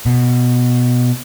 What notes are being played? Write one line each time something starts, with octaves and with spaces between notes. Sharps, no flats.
B2